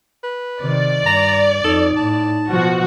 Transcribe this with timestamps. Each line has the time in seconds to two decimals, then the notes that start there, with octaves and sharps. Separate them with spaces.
0.23 B4
0.61 C3 D#3 D5
1.06 G2 A#5
1.64 F2 D#4 A4
1.97 A2 A5
2.50 B2 F3 F#4